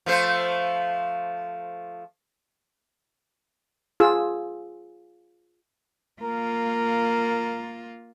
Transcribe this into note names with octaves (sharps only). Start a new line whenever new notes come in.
F3 A3 C5
F4 G#4 E6
A#3 F4 A#4